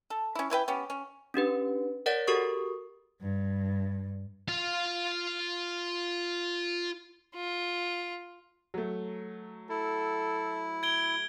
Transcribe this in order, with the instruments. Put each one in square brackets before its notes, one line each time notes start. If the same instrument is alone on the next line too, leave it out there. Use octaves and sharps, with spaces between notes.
[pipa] A4
C#4 E4
E3 E4 B4 G5
B3 C#4 G4
C#4
[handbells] C#4 D4 G4 B4
A#4 C#5 D5 F#5 A6
F#4 G4 A4 A#4 C#6 D#6
[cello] G2
[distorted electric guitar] F4 F5
[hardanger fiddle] F4
[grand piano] F#3 A3
[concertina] E4 [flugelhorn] A4
[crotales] G#6 D7 G7